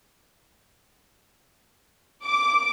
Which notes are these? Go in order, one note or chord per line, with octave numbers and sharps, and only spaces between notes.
D6